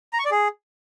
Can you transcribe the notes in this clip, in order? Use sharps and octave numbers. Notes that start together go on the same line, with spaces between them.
A#5
C#6
D5
G#4